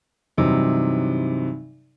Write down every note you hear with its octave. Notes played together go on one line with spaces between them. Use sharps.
G2 C3 E3 F#3 D#4